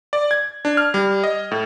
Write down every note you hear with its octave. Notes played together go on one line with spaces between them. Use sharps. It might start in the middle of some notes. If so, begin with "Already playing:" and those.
D5
G#6
D4
F6
G3
D#5
A2